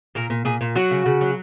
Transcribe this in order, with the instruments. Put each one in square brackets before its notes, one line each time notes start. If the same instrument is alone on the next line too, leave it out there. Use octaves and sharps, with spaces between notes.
[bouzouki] A#2 A#4
A#2
A#2 G#4
A#2
F#3 F#4
C#3
C#3
F#3